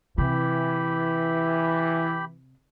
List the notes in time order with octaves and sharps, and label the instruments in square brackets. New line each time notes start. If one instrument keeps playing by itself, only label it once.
[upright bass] C3 [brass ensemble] E3 [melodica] G4 B5